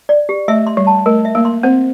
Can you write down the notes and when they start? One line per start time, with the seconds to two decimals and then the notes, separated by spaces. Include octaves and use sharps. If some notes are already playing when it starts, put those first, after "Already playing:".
0.09 D5
0.29 G4
0.48 A3 E5
0.67 C6
0.77 G3
0.87 A5
1.06 A3 A#4
1.25 E5
1.35 A#3
1.45 C6
1.63 C4 C5